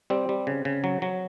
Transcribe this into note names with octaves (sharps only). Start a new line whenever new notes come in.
G3 C4
G3
C#3
C#3
F#3
F#3